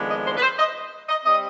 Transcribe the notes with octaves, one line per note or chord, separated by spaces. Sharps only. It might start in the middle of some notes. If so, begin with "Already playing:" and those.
Already playing: F2 D#3 G#3 B3 D4
D#5
C5
B4
C5
D#5
D#5
G3 C4 D#5